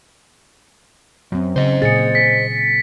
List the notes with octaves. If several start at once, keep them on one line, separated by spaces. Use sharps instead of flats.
F#2 F#3 C4
C#3 C5 D#5
A#2 G#4 A6 C#7
B6